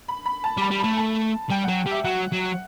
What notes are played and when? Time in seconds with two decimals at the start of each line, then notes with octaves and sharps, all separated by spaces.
0.08 B5
0.26 B5
0.44 A5
0.57 G3 B5
0.71 G3
0.80 B5
0.84 A3
0.97 A5
1.50 G3 G5
1.64 F#5
1.68 F#3
1.86 G3
1.91 E5
2.04 F#3 F#5
2.32 F#3